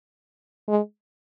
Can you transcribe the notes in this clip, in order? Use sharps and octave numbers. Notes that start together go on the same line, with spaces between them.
G#3